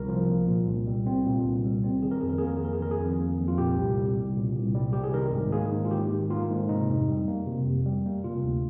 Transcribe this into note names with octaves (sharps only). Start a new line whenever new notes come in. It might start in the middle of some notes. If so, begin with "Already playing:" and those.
Already playing: C2 A#4
F3
A#3
A#2
C2
G3
C4
A#2
C2
G3
C4
D#3 G#4
A#4
F2 G#4
A#4
A#3 G#4
A#4
G#4
F2 A#4
G#4
D#3 A#4
G#4
F2
A#3
F2
F4
A#2 G4
C2
G3
C2
A#2
C2
G3
C2 G4
G#4
D#3 A#4
G#2
A#3 G#4
G#2
F4
D#3 G4
G#2
A#3 F4
G#2
C3 D#4
F2
G3
A#3
C3
F2
G3
A#3
C3 F4
D2